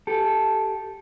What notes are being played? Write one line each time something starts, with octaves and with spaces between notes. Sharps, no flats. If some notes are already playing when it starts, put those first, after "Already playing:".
G4 A4